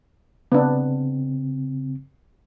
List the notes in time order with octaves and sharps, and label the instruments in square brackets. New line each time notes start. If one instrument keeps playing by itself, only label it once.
[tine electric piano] C#3 C4 [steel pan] B3 D4